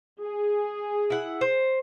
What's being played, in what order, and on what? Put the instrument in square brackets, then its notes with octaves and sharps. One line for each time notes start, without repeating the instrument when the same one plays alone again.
[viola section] G#4
[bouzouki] E4 F#5
C5